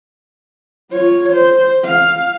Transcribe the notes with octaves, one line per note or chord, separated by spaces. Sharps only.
F4 C#5
C5
F5